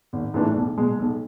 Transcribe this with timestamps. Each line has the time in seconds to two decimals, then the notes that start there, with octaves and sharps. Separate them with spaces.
0.13 G#1
0.34 G#2 E3 A3 D4
0.56 B1
0.77 B2 G#3
0.99 B1